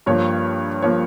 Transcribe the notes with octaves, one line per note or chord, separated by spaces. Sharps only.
G2 F3 A#3 C#5
F3 A#3 C#5